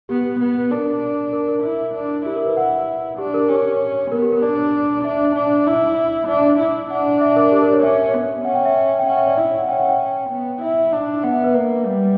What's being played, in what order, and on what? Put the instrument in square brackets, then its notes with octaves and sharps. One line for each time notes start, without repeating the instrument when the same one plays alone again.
[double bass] B3 [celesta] G4
[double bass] B3
[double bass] D4 [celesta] A#4
[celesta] A#4
A#4
[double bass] E4
D4
[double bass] E4 [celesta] G4
[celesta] A#4
B4
F#5
[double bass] D4 [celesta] G4
[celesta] A#4
[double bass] C#4 [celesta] G4
[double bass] B3 [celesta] A#4
[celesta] G4
A#4
[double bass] D4 [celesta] D5
[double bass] D4 [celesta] E5
[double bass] D4
E4
[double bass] D4 [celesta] E5
[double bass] E4
[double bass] D4 [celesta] F#5
[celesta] E5
A#4
G4
A#4
C#5
[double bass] C#4 [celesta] E5
[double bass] B3
[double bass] C#4 [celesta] F#5
[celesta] G5
E5
G5
[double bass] C#4 [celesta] F#5
[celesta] E5
D5
[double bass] E4 [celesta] E5
[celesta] F#5
[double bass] C#4 [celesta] G5
[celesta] F#5
G5
[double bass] B3
[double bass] E4 [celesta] E5
[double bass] D4
[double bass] B3 [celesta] F#5
[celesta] E5
B4
[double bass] A#3 [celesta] B4
[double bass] G3